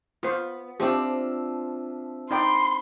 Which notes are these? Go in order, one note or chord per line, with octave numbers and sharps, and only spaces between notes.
B3 F4 C5
F3 C4 D4 G4 E5
D#4 D5 G5 B5 C6